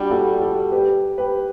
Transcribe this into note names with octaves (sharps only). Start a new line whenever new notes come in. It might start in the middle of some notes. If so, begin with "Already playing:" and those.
Already playing: G3 D4 F#4
F#4 A4
F#4 A4
G4 B4
G4 B4